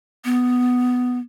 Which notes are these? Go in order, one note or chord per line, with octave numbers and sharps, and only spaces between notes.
B3